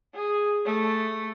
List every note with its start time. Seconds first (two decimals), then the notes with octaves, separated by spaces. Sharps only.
0.15 G#4
0.65 A3